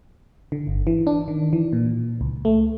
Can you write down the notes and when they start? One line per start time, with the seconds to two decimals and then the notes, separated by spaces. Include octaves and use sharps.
0.52 D3
0.67 G1
0.87 E3
1.07 D4
1.28 D#3
1.53 E3
1.73 A#2
2.21 C#2
2.45 A3